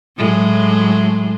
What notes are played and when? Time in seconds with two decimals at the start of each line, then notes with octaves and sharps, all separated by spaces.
0.18 A2 F#3 G#3